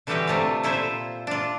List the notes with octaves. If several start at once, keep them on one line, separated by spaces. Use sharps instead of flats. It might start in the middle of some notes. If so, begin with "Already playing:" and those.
D3 E3 G3 F#4 G4 B4
C3 A3 F4 F5
A#2 E4 F4 C5 E5
D4 F4